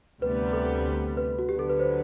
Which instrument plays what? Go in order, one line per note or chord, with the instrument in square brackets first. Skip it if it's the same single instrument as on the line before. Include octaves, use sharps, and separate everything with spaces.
[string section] D2 C3 G3 B3 [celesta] B4
[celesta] A4
B4
F#4
[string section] D2 D3 F#3 B3 [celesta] G4
[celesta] A4
B4
C5